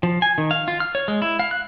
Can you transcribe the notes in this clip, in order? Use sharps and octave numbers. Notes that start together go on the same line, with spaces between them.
F3
G#5
D#3
F5
F4
F6
C#5
G#3
E4
F5
F#6